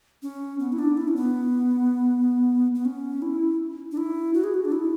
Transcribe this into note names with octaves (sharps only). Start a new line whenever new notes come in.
C#4
B3
E4
D4
E4
C#4
B3
B3
C#4
E4
D4
E4
F#4
G#4
F#4
D4
E4